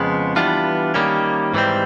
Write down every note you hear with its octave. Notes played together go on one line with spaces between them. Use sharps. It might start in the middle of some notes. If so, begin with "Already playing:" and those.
Already playing: F2 C#3 F3 G#3 B3
E3 G3 B3 D4 F4
D#3 G3 A#3 C#4
G#2 E3 G3 C4